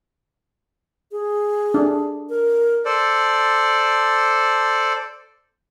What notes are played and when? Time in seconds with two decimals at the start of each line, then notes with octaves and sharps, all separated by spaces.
1.12 G#4
1.74 D4
2.29 A#4
2.85 A4 C5 D5